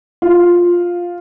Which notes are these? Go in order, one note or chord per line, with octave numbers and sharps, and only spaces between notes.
F4